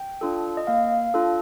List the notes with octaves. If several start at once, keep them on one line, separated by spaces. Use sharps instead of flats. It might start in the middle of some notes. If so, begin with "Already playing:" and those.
Already playing: G5
D4 F4 A4
D#5
A#3 F5
D4 F4 A4